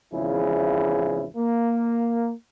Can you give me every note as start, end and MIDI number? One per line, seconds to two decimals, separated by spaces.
0.12 1.24 32
0.12 1.24 40
0.12 1.24 49
0.12 1.24 53
0.12 1.24 64
0.12 1.24 68
1.36 2.30 58